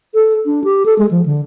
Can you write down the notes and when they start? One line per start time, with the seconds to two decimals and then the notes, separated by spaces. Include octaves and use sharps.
0.14 A4
0.46 D4
0.64 G4
0.85 A4
0.98 G#3
1.11 F3
1.25 D3